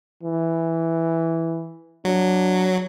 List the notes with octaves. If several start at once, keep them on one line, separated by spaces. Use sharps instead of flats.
E3
F#3 D4